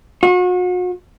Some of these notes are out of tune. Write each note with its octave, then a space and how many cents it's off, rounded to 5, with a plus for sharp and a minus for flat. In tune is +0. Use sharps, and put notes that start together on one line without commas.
F#4 -40